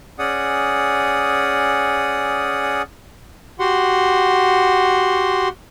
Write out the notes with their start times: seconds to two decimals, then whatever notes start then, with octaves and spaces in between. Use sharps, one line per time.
0.19 C#4 G#4 D5 F#5 D#6
3.60 F#4 G4 F#5 C6